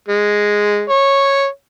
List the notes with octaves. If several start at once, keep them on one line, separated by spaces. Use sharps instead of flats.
G#3
C#5